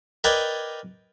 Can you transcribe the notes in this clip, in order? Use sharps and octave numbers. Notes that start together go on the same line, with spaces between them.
A#4 B4 D5 D#5 G5 G#5